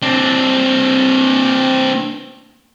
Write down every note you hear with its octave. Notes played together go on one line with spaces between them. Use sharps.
C4 D4